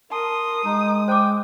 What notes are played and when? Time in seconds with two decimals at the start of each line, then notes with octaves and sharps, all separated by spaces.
0.11 A#4 A5 C6 D#6
0.65 G#3 D#4
1.08 C5 G5 D6